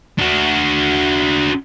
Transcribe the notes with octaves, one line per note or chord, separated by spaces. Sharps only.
D4 F#4